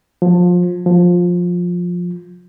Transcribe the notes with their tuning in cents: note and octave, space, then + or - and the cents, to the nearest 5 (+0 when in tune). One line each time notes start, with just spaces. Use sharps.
F3 +25
F3 +15